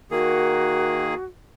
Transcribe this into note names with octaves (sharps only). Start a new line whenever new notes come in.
D#3 A#3 F#4 G#4